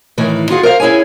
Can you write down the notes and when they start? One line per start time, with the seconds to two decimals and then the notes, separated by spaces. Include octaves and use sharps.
0.18 A2 D#3 E3
0.50 F4 F#4 G#4
0.63 A#4 C5 D#5 F5
0.80 C#4 E4 G#4 C#5 G#5